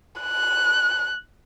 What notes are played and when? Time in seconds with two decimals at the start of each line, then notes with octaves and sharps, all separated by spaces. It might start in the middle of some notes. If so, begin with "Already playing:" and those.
0.21 F#6